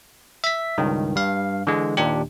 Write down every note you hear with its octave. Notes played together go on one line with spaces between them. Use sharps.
E5 B6
C#2 G2 D#3
G2 F5
D3 E3 G#3
D#2 A#2 D4 G4